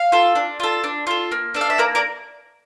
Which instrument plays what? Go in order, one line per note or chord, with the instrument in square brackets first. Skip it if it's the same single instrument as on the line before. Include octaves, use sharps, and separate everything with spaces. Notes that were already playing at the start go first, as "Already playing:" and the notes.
Already playing: [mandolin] F5
F4 A4
D4
F4 A4
D4
F4 A4
A#3
D4 A4
F5
E5
A#3 A#4 D5
A#4 D5